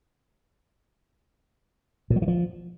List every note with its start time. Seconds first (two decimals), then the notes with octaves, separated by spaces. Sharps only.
2.10 A#2
2.16 F#3
2.22 E3
2.28 F3